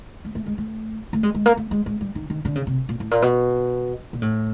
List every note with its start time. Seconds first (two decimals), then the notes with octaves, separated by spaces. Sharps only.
0.25 A3
0.35 A3
0.46 G#3
0.58 A3
1.13 A3
1.23 G#3
1.34 G#3
1.46 A#3
1.57 A3
1.71 G#3
1.86 G#3
2.01 G3
2.15 D#3
2.30 D#3
2.45 D3
2.56 C#3
2.67 C3
2.89 A#2
3.00 A2
3.11 A#2
3.22 B2
4.13 A#2
4.22 A2